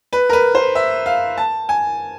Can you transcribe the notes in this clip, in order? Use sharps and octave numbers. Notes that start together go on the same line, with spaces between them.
B4
A#4
B4
C5
E5
F5
A5
G#5